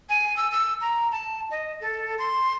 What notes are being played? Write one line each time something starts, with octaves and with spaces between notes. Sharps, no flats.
G#5
E6
E6
A#5
A5
D#5
A4
C6